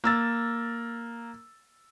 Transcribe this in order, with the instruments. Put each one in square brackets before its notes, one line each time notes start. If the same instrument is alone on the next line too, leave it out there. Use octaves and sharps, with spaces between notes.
[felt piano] A#3 E6 A6